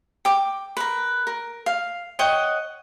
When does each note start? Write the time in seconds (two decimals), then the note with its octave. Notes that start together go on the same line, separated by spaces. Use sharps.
0.25 G5 D6
0.77 A#4 B4
1.27 A#4
1.66 F5
2.19 C#5 D#5 F#5 G5